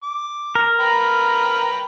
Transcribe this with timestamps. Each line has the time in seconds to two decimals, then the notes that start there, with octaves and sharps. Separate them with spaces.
0.03 D6
0.55 A#4
0.80 B4 G5 A#5